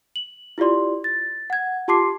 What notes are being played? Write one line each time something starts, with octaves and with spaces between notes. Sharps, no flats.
F#7
E4 F4 G4 D5 C6
A6
F#5 G#6
F4 G4 A5 C6 D6 C7